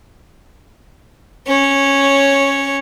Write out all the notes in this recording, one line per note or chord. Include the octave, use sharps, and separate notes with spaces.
C#4 C#5